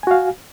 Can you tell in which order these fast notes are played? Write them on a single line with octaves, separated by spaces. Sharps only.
G#5 F#4 F5